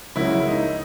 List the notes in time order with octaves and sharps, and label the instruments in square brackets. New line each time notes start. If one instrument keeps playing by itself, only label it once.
[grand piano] C#2 C#3 F#3 A#3 E4
D#4